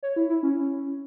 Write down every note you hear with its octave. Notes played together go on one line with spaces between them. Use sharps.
C#5
E4
E4
C#4